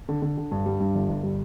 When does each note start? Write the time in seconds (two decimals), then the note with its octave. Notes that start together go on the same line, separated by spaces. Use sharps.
0.09 D3
0.22 D3
0.37 D3
0.52 G2
0.66 G3
0.80 G2
0.95 G1
1.09 G1
1.23 G3